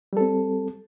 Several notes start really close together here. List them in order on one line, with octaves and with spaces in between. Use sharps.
G3 A4 C4